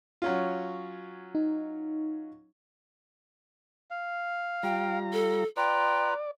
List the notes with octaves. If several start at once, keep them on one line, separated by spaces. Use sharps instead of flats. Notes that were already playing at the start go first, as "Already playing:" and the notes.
F#3 C#4 F4
D#4
F5
G3 F4 G5 A#5
A4
F4 B4 D5 G5 A#5